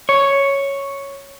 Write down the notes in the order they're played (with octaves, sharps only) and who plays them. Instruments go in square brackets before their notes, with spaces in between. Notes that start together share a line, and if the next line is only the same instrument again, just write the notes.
[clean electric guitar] C#5